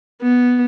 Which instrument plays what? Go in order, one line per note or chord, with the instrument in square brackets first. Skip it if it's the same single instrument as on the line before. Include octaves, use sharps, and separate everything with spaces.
[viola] B3